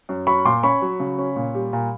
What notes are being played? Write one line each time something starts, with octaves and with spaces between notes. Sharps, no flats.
F#2
F#3 B5 C#6
A#2 C6 D6
C#4 B5 C#6
F#3
C#3
C#4
A#2
G3
A#2